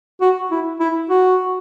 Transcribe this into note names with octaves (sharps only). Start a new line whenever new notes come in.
F#4
E4
E4
F#4